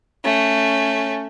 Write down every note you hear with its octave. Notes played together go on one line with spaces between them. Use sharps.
A3 C#4